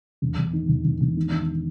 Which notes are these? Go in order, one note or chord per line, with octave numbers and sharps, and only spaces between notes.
E1
E1
D#3
E1
E1
E1
D#3
D#3